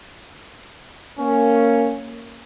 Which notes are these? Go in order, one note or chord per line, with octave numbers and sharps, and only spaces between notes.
A#3 C#4